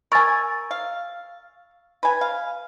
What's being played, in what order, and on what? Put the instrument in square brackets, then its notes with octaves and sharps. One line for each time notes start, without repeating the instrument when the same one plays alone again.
[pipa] A#4 G#5 [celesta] C#6 E6 A6
[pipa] F5
B4 G#5
F5